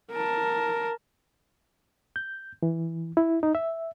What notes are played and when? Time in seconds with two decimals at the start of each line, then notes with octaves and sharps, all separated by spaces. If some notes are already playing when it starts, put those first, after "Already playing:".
0.11 A#4 A5
2.16 G6
2.63 E3
3.17 E4
3.43 D#4
3.55 E5